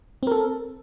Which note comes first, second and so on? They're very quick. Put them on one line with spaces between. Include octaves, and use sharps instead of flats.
C4 A#4 A4